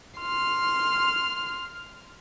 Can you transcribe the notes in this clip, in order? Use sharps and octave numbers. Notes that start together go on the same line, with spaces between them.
C6 F6